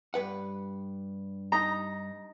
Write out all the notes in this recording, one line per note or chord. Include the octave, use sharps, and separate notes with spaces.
G2 B4 F#5
D#4 A#5